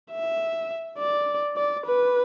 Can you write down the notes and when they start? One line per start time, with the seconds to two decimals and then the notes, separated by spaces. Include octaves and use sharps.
0.12 E5
0.98 D5
1.57 D5
1.86 B4